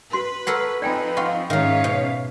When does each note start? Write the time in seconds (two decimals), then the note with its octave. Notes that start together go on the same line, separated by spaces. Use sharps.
0.13 F#4 B4 C6
0.47 A4 A#4 C#5 F#5
0.82 F3 C4 D#4 B4 D5 G5 G#5
1.17 F4 F#5 G5 C#6
1.50 G#2 D#3 C#4 A#4 C#5 E5 F5
1.84 B2